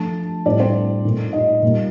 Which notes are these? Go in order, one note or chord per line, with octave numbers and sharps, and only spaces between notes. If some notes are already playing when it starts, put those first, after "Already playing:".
Already playing: F3 A3 D4 A5
A2 G3 C4 D4 D5
C4 C5
A#2 A3 D#4
D#4 D#5
A#2 G3 A#3